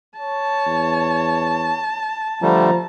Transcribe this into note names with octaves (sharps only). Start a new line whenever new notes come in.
C#5 A5
E2
D3 F3 G3 A3 A#5